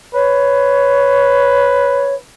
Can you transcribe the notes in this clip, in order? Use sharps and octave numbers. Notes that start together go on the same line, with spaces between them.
B4 C#5